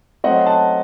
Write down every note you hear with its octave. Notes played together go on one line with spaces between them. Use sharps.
F#3 A3 C4 D#5 F#5
F#5 A5